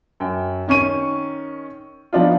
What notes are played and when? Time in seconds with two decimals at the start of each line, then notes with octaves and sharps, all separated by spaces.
0.20 F#2 G5
0.68 D#3 C#4 C#6 D#7
2.13 F3 B3 D4 D#4 F4